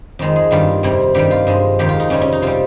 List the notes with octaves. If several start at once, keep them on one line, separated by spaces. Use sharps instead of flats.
F2 D#3 G#3
G#4
G2 D#3 G3 F4
F2 C3 G3
G2 D#3 G3 G4
F4
G2 F3 G#3
F2 D#3 G#3 G4
F4
D#4
F2 C3 G3 C#4
C#4
D#4
C3 G3 F4